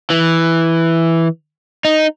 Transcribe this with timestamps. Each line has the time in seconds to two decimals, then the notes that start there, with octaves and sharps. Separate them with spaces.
0.10 E3
1.85 D#4